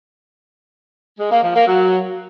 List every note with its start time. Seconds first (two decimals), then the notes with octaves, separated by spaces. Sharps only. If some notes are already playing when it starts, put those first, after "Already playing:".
1.19 G#3
1.31 A#3
1.43 F3
1.55 A#3
1.67 F#3